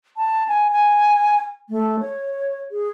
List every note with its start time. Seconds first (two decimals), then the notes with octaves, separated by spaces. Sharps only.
0.17 A5
0.48 G#5
0.70 G#5
1.69 A3
1.99 C#5
2.71 G#4